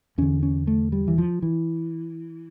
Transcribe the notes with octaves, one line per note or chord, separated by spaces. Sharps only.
E2 D3 C#4
C#4
A3
G3
E3
F3
E3